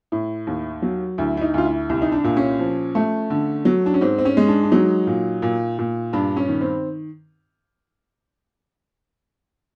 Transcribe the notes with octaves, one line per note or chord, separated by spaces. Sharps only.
A2
D#2
F#3
D2 E4
E4
D#4
D2 F4
E4
C2 E4
D#4
D4
A#2
C#4
F3
A3
D3
F#3
D4
C#4
G#2 C4
C4
C#4
G#3
D4
D4
F#3 D#4
A#2
A#2
A#2
G2 D4
C#4
D#3
C4